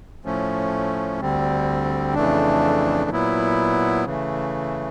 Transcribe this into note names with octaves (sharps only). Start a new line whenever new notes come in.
A2 F3 A3 C#4
D2 D3 G3 C4
F2 C#3 E3 A3 D4
A#2 F#3 B3 E4
C#3 E3 A3